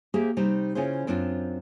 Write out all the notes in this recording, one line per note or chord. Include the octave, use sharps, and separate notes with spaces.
A#3 G4 G#4 C5 E5
C3 G3 D#4 C5
C#3 C#4 E4 F4 G#4 C5
F#2 C4 D4 F4